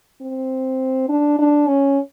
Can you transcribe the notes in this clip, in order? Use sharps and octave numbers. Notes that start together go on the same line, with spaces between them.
C4
D4
D4
C#4